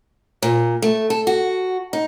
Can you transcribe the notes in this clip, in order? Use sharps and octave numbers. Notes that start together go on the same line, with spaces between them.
A#2
A3
A4
F#4
D#4